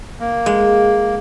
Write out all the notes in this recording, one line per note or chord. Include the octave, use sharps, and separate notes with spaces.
A#3
G#3